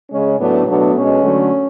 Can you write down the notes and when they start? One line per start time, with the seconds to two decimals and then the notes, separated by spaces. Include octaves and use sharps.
0.10 C#3 G#3 C#4
0.38 A2 F#3 A3 B3 D4
0.67 B2 F#3 A3 B3 D4
0.95 B2 G#3 C#4
1.23 D3 F#3 A3